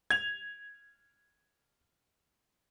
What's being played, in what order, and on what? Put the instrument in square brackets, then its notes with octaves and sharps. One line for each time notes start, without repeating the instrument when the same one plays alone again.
[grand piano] G#6 F7